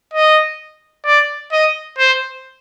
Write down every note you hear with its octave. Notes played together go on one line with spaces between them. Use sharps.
D#5
D5
D#5
C5